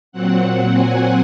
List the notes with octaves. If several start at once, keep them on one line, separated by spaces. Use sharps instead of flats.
A#2 F#3 C4 F#5
G#5